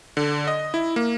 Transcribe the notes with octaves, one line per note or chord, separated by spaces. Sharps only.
D3
D#5
E4
A#3